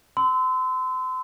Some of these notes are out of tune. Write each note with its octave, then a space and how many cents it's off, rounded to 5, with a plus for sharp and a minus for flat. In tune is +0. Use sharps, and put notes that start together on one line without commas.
C6 -35 E6 -20